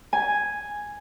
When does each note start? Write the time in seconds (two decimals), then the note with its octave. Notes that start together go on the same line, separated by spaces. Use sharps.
0.13 G#5